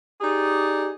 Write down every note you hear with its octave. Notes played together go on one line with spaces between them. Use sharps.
D#4 G4 G#4 D5